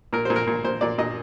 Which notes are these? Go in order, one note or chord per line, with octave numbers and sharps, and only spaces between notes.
A#2 A#4
A#2 C5
A#4
A#2
A#2 C5
A#2 D5
A#2 D#5